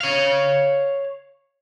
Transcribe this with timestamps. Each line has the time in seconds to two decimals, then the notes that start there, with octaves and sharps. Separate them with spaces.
0.01 C#5 F5